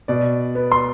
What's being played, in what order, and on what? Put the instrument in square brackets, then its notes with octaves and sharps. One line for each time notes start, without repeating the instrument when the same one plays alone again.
[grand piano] B2 D5
B3
C6